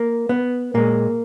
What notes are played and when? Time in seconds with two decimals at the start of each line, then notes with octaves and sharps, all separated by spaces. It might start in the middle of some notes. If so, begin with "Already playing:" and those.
Already playing: A#3
0.29 B3
0.74 A#2 G#3 A#3